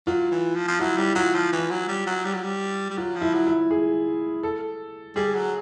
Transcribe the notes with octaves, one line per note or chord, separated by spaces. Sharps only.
F#3 F4
E3
F3
F3
F#3 E4
G3
F#3 F4
F3
E3
F#3
G3
F#3
G3
F#3
G3
G3
F#3 F4
F3
E4
F#3
E4
G#4
A4
G3 G#4
F#3